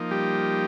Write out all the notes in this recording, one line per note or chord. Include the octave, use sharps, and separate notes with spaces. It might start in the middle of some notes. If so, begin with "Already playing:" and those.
Already playing: F3 A#3 D#4
G3 G4